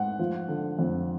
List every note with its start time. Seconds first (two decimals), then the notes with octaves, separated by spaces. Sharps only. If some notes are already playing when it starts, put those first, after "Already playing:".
Already playing: G#2 F#5
0.19 F3
0.48 D3
0.79 F2